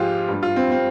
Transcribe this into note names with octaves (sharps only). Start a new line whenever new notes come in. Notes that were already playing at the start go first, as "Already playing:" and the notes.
Already playing: G#2 F3 G#3 F4 G4 G#4
G2 G3
F4
C4
C4